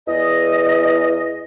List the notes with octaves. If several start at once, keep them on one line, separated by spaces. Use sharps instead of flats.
E2 D#5